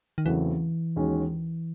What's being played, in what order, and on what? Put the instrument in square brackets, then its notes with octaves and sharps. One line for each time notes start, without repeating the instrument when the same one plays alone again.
[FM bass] D#3
[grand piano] E2 C#3 F#3 A3 C4 [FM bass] E3
[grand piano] D#2 D#3 G#3 C#4 F#4